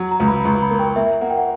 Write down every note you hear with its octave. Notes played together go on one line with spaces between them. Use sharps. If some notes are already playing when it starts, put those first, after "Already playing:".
Already playing: F#3
A#5
C#2
B5
C#2 A#5
B5
A#3
G5
A#3 E5
A#3 F#5
G5
F#5